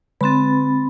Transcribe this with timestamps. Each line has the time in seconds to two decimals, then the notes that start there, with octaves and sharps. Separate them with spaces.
0.21 D3 C4 B5 C6 A6